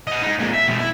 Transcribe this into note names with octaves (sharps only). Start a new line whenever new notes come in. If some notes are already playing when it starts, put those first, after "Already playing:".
D#5 F#5
G#3 D#4
A#2 G#3
E5
B2 G#3
E4